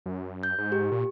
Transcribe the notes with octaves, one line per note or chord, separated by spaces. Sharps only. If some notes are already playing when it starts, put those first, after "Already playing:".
F#2
G6
G#2
G4
A#2